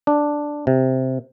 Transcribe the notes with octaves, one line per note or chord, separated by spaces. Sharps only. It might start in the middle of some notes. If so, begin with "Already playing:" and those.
D4
C3